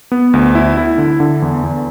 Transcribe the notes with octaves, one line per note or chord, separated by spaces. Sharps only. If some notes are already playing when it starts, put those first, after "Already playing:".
B3
D2
E4
E4
D3
D3
E2
E2